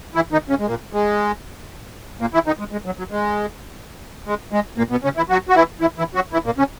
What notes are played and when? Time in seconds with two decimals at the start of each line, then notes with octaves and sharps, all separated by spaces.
0.15 E3 E4
0.32 D#3 D#4
0.50 C#3 C#4
0.59 G#3
0.67 A#2 A#3
0.93 G#3
2.21 A#2 A#3
2.34 E3 E4
2.47 D#3 D#4
2.59 G#3
2.72 G#3
2.86 F#3
2.98 F#3
3.11 G#3
4.27 G#3
4.52 G#3
4.78 A#2 A#3
4.91 B2 B3
5.04 C#3 C#4
5.17 E3 E4
5.30 F#3 F#4
5.49 F#4
5.55 E3 E4
5.81 E3 E4
5.98 E3 E4
6.15 F#3 F#4
6.32 E3 E4
6.46 A#2 A#3
6.58 C#3 C#4